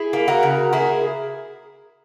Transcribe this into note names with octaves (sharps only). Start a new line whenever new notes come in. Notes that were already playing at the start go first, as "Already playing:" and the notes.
Already playing: E4 G#4
A#3
F#4 A#4
C#3
A#3 E4 G#4